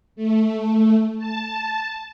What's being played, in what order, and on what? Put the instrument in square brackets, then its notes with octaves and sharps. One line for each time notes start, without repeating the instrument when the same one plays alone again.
[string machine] A3
A5